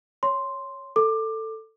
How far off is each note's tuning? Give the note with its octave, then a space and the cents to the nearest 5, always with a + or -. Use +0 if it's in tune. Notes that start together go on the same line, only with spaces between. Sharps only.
C#5 +0 C6 +0
A4 +15 D6 +20